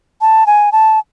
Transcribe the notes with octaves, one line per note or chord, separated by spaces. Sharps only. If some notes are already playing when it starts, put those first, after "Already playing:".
A5
G#5
A5